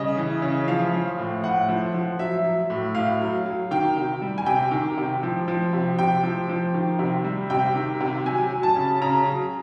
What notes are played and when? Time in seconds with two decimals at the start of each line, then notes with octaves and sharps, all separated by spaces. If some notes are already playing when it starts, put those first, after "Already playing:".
Already playing: C#3 G3 D#5
0.17 E3
0.42 C#3
0.68 F3 F5
0.94 F3
1.18 A2
1.44 A2 F#5
1.69 F3
1.94 F3
2.19 F#3 E5
2.44 F#3
2.70 A2
2.95 A2 F5
3.21 F#3
3.46 F#3
3.71 D#3 G5
3.97 C3
4.22 G3
4.38 G#5
4.46 C3 G5
4.71 D#3
4.98 C3
5.23 F3
5.48 F3
5.73 C3
5.99 C3 G5
6.23 F3
6.49 F3
6.74 D#3
6.99 C3
7.24 G3
7.50 C3 G5
7.75 D#3
8.01 C3
8.26 F#3 G#5
8.51 F#3
8.63 A5
8.76 C#3
9.01 C#3 A#5
9.26 F#3